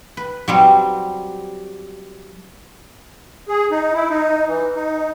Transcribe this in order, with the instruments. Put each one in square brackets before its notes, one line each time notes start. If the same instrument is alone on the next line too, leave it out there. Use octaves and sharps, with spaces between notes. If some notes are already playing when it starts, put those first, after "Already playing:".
[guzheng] B4
F#3 G3 C4
[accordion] G#4
D#4
E4
D#4
E3
D#4